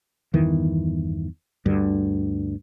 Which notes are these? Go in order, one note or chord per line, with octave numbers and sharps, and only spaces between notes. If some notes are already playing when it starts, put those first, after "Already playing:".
G1 E2 D#3 E3
D2 G2 D3